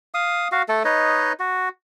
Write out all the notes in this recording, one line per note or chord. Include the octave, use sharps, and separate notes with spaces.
F5 D#6
F#4 F5
A3 A4
D#4 B4 C#5 D#5
F#4